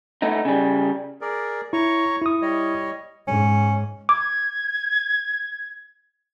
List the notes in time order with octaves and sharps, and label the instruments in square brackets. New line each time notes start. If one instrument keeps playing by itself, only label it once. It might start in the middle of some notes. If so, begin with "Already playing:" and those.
[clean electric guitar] A3 B3 D#4
C#3 G3
[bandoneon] G#4 A#4 D5
[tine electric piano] E4 [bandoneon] C#5 A#5 C#6
[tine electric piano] E4 D#6
[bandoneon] G3 C#5 D#5
[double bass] G#2 [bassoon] C#4
[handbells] D6 [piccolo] G#6